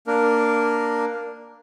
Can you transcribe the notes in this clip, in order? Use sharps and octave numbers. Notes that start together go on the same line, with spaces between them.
A#3 D4 A#4